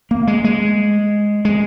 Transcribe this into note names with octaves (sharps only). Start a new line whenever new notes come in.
A#3
G#3
G#3
G#3